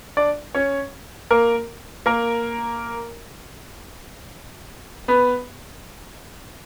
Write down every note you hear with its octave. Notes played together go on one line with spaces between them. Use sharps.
D4 D5
C#4 C#5
A#3 A#4
A#3 A#4
B3 B4